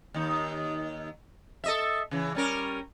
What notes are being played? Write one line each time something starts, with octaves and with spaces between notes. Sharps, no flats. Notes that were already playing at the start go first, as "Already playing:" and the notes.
D#2 D#4
A4 D#5 E5
C#3 E3
G3 C#4 A#4